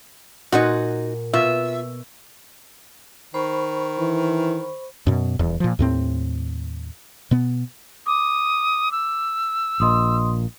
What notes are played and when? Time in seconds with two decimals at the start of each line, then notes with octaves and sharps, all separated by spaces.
0.52 A#2 D#4 F#4 F#5 G#5
1.33 B2 F4 E5
3.34 D#3 C5 B5 C#6
3.99 E3
5.07 F#2 B2
5.39 D#1 E2
5.60 A#2 F3
5.79 D#2 A2 C4
7.31 B2 B3
8.06 D6 D#6
8.92 E6
9.80 A#1 A#2 D#5 C6 D#6